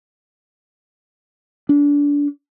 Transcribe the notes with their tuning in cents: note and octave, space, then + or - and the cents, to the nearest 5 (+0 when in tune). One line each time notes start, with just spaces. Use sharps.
D4 -25